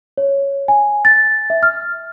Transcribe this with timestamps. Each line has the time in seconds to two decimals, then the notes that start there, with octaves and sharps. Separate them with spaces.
0.18 C#5
0.68 G#5
1.05 A6
1.50 E5
1.63 F6